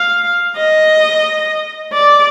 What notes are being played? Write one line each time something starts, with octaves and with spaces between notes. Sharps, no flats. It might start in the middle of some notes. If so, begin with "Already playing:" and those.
Already playing: F5
D#5
D5